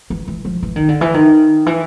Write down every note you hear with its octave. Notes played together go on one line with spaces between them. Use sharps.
E3
E3
F3
E3
D#3
D3
E3
D#3
E3